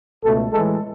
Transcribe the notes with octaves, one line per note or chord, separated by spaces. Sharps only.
C#2 B2 A3 A4
A2 E3 G#3 A4